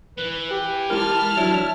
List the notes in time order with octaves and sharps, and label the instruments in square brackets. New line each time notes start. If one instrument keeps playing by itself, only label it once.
[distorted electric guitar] E3 [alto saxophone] B4
[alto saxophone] G4
[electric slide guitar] G#3 E4 A#4 [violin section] A5 F6
[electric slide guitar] F#3 D4 [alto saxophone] E4